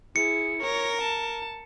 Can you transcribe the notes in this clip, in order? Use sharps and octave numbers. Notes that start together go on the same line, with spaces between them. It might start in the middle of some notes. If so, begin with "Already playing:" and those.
E4 G#4 C#7
A#4 C#5 A#6
A5